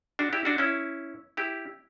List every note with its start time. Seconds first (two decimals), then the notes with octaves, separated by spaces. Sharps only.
0.19 D4 F#4
0.33 E4 G4
0.45 D4 F#4
0.58 C#4 E4
1.37 E4 G4